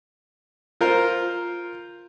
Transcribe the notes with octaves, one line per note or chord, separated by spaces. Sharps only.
F4 A#4 C5